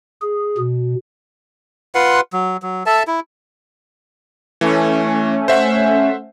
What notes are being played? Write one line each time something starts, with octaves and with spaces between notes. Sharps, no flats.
G#4
B2
F4 B4 F#5 C6
F#3
F#3
A4 E5 A5
E4
E3 A3 C#4
C5 E5 F#5